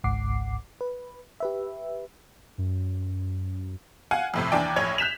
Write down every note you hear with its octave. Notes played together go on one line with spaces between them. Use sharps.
G#1 C#2 G#2 F#5 D6 C7
B4
G4 B4 E5
F#2
F5 F#5 G#5
F2 A2 C3
D#2 E3 D4 D5 G5
A#1 A2 C#5 G#6
F#6 G6 B6 E7 F7